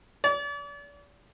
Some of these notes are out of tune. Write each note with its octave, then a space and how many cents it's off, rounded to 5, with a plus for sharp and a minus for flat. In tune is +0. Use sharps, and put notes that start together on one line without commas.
D5 -40